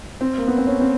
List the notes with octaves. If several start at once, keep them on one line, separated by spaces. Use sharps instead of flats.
C4
A#3
B3
C4
C#4
C4